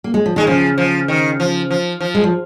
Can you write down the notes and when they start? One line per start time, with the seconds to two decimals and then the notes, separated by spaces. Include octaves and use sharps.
0.04 A#3
0.14 G#3
0.26 F3
0.36 D#3 G#3
0.47 C#3 F3
0.78 F3
1.08 D#3
1.40 F3
1.71 F3
2.01 F3
2.15 G#3
2.24 F3